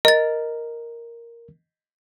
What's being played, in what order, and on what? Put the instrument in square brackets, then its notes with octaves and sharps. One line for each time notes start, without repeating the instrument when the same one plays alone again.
[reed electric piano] A#4 [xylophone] D#5 A6